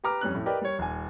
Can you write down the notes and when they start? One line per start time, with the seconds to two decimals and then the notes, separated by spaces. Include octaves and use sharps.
0.04 G4 B4 A#5 D6 F6
0.21 F2 G3 C#4 F#6
0.35 A2
0.46 G4 A#4 B4 D5 D#5 G5
0.62 G3 C#5
0.79 D#1 G#5